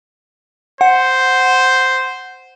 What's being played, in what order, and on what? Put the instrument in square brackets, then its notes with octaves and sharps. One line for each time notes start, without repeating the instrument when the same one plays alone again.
[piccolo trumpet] C5 [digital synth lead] F#5